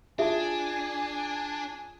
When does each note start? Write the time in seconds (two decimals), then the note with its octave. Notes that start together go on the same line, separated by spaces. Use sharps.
0.19 D4 F4 G#4 E5 G#5 A5